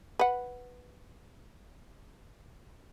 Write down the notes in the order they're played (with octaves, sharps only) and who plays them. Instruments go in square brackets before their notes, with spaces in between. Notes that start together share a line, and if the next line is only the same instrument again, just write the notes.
[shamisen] B4 F#5